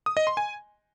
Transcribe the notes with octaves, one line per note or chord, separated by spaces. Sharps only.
D#6
D#5
C6
G#5